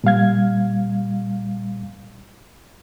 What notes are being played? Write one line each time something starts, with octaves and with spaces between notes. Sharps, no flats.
A#2 G3 F5 G#6